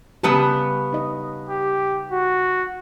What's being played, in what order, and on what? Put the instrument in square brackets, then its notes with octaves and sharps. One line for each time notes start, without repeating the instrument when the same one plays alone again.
[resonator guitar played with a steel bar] C#3 B3 A5 [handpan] G3 G4
[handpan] D#4 D#5
[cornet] G4
F#4